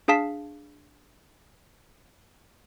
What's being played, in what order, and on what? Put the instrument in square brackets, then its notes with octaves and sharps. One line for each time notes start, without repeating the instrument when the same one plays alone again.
[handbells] D4 G#4 F5 A5 B6